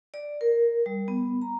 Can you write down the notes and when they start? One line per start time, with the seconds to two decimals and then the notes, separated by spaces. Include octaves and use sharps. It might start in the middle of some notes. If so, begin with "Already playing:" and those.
0.14 D5
0.41 A#4
0.86 G3
1.08 B3
1.42 A#5